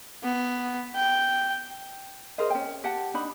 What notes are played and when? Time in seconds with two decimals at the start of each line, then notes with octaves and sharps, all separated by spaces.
0.23 B3
0.96 G5
2.38 G#4 A#4 C5 D#5
2.50 C#4 G5
2.84 G4 F#5 A5
3.14 D4 D#4 B5